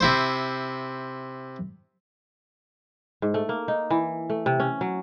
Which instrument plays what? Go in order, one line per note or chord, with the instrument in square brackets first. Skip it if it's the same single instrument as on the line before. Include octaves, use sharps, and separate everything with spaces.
[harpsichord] C3 E4 C5
[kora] G#2
A3
A#3
D#4
E3
A3
C3
C#4
F#3